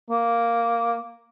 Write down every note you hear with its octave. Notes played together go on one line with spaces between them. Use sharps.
A#3